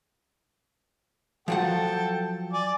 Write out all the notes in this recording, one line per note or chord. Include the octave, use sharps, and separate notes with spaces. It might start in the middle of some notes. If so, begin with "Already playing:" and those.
F3 F#3 A4 F#5 G5
D5 G#5 D6